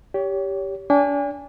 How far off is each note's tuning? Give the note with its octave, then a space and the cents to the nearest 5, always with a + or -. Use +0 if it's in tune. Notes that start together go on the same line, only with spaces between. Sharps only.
G4 +0 C#5 +30
D4 -35 G#5 -35